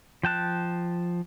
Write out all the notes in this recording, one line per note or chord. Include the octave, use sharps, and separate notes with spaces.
F3 G5 A5 F#6